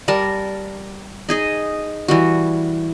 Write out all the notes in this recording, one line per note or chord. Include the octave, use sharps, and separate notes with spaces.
G3 A#4 A5
D#4 G#4 D#5
E3 G3 F#4